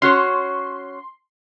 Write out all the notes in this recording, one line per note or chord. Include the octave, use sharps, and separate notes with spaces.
C#4 F#4 C#5 C6